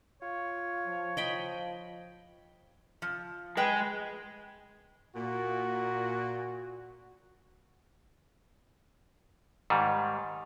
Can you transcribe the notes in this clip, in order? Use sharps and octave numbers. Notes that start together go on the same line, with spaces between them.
F4 C#5
F3
D#5 G5 B5
F3
G#3 B4 G5
A#2 F#4
G#2 D#3 G3